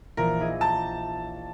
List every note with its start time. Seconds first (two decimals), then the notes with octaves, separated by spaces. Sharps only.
0.17 A#1 E3 A#4
0.40 E4 G#4 D#5
0.61 G5 A5 A#5